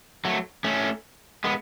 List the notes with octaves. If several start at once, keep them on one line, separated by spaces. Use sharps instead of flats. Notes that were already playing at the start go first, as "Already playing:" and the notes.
F#3 A3
A3 C#4
G#3 B3